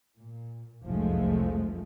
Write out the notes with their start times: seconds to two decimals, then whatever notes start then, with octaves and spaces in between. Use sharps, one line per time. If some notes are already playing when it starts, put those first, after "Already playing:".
0.17 A#2
0.87 F1 C2 F#2 F3 G#3 A3